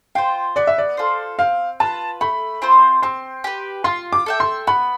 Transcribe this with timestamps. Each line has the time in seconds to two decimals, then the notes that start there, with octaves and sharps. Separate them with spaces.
0.15 F4 C5 G5
0.56 B3 D5
0.67 E5
0.78 D5
0.97 F4 A4 C5
1.39 C4 F5
1.80 F4 B4 A5
2.21 A3 B5
2.62 C4 F4 C5
3.02 C4 C6
3.44 G4 B4
3.84 F4 C6
4.13 D6
4.26 A4 E5 G5
4.40 C6
4.67 B3 B5